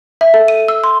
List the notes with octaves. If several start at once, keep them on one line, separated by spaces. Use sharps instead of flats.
E5
A4
D#7
E6
C6